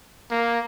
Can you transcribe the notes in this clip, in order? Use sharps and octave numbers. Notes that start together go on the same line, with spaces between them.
A#3